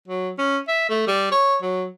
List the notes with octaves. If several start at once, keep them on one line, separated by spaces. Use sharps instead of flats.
F#3
C#4
E5
A3
G3
C#5
F#3